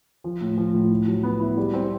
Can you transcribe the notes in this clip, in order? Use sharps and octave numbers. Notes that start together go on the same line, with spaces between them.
F3
A2
F3
A2
E4
F#3
B3
E4
G3
C4